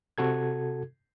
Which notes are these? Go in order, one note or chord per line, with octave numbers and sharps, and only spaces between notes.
C3 F#4 A4 G#6